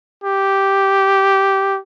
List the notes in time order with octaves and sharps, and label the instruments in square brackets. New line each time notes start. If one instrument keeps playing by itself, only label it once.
[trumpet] G4